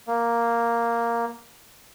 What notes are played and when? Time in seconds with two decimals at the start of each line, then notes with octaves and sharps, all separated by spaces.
0.07 A#3